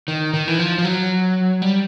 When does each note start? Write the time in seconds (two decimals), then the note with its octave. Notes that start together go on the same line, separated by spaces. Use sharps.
0.08 D#3
0.34 D#3
0.48 E3
0.59 F3
0.78 F3
0.85 F#3
1.62 G3